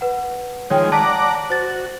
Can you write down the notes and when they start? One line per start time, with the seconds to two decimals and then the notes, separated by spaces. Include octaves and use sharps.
0.01 B4 F#5
0.70 D#3 F3 G#3 C#5 G5
0.92 D5 F#5 A5 A#5 B6
1.50 F#4 C5 A6